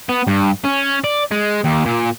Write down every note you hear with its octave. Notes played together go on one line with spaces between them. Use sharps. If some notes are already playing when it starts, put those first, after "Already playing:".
B3
G2
C#4
D5
G#3
D#2
A#2